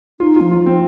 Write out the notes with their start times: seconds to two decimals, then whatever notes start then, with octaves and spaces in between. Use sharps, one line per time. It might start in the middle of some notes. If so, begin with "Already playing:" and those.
0.20 D#4 F4
0.36 F4
0.41 F3
0.51 F4
0.61 F3
0.66 C4